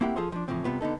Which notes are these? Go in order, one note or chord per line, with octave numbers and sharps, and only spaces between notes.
A#3 C4 E4 G4 F#5 G5
F3 F4 G#4 A4 C5
F3 D4
A2 C#3 E3 F3 C4
C2 C3 B3 F4
D3 B3 D#4 A4